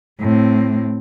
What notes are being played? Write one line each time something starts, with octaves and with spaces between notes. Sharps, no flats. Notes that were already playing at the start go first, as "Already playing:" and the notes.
A2 C4